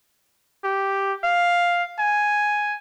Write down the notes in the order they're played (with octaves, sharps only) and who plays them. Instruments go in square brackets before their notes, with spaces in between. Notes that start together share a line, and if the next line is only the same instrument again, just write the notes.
[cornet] G4
F5
G#5